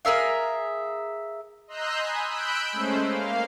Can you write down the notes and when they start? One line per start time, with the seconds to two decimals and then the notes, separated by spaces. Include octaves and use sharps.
0.05 G#4 A#4 E5 F5
1.68 D#5 A#5 C6 E6 F#6 G6
1.97 G#5 B5 D#6
2.30 B5 E6 F#6 G6 D7
2.72 G#3 A3 C#4 C5
3.08 A#3 F5